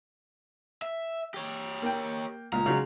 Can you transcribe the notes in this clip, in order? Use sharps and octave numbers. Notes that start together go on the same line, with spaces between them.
E5
G4 C#5
A#3 G5
C#2 A#2 A#5
C#3 F#3 G#3